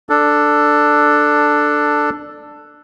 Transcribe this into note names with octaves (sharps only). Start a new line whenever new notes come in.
D4 A4